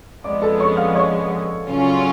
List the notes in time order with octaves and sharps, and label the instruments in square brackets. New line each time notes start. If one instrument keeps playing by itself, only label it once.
[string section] F2 F3 G#3 B3 [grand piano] D5 D6
[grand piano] A4 A5
C#5 C#6
F5 F6
C#5 C#6
[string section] C#3 F#3 C#4 F4